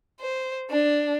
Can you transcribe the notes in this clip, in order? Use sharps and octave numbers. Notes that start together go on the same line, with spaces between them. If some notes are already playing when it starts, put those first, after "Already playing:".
C5
D4